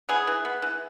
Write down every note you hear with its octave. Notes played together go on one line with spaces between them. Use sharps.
B3 E4 G#4
E3
B3
E3